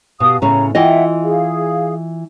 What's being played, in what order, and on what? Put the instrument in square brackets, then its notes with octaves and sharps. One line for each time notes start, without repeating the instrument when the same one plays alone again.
[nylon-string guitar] B2 [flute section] G4 F5 D#6
[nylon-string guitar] A2 C#3 C#4 [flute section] A#5
[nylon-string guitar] E3 F4 D#5 [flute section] E5 F#5 G5
[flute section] G#4 F5